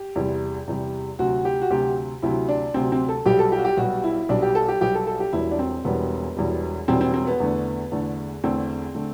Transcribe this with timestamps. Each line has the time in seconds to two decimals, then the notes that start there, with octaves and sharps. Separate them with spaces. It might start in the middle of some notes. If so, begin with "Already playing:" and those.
Already playing: G4
0.16 E2 C3 G3
0.67 E2 C3 G3
1.19 D2 C3 F#3 F#4
1.45 G4
1.62 F#4
1.70 D2 C3 F#3 G4
2.22 D2 C3 F#3 E4
2.49 D4
2.74 D2 C3 F#3 C4
2.92 C4
3.08 A4
3.26 B1 B2 G3 G4
3.39 A4
3.52 G4
3.58 F#4
3.65 G4
3.77 B1 B2 G3 F#4
4.04 E4
4.29 B1 B2 G3 D4
4.42 G4
4.55 A4
4.68 G4
4.81 B1 B2 G3 G4
4.95 A4
5.07 A4
5.20 G4
5.33 E1 E2 B2 G3 E4
5.51 D4
5.59 C4
5.84 E1 E2 B2 G3 B3
6.36 E1 E2 B2 G3
6.88 E1 E2 B2 G3 C4
7.01 C4
7.14 C4
7.27 B3
7.40 E2 D3 A3
7.92 E2 D3 A3
8.44 E2 D3 A3 C4
8.95 D3 A3